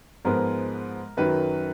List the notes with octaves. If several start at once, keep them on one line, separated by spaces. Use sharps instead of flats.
G#2 F3 G#3 B3 A#4
F#2 D#3 F#3 B4